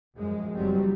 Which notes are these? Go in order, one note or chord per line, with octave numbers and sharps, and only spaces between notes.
F#2 F3 G#3
F#1 F#3 G3 C4